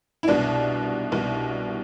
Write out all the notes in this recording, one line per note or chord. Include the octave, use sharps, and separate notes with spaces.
E4
C2 B2 D4
C2 B2